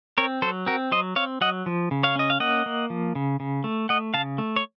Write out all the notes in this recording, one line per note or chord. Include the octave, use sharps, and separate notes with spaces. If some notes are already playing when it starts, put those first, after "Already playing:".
C4 A#4 C#5
F#3 A4 C5
C4 F#4 A#4
F#3 C5 D#5
C4 C#5 F5
F#3 D#5 F#5
F3
C#3
C#5 F5
C#4 D#5
F5
A#3 D#5 F#5
A#3
F3
C#3
C#3
A3
A3 D#5 F#5
C#3 F5 A5
A3
C#5